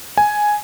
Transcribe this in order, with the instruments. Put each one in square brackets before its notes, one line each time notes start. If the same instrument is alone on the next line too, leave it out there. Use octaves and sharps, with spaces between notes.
[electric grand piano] G#5